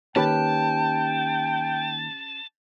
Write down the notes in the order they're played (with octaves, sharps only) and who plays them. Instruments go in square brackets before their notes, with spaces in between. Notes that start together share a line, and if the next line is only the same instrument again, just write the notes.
[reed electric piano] D#3 A#3 D#4 [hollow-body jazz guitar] C#4 G4 B4 [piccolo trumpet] G5 [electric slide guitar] A5